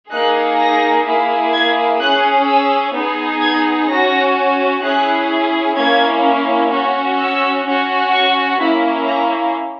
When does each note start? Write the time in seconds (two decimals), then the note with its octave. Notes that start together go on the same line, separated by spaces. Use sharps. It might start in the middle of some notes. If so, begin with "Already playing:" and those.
0.11 A#3 D#4 G#4 F#6
0.59 A#6
1.06 A#3 E4 G#4
1.52 G#6
2.00 C#4 G#4 F#6
2.47 E6
2.94 B3 D#4 G#4
3.41 G#6
3.88 C#4 F#4 A#6
4.83 C#4 E4 G#4 F#6
5.77 A#3 C#4 E4 G#6
6.71 C#4 F#4
7.19 E6
7.66 C#4 F#4
8.13 C#6
8.60 A#3 C#4 E4 B5
9.07 A#5